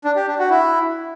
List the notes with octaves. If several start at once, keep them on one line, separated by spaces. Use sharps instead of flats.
D4
G4
D4
F#4
E4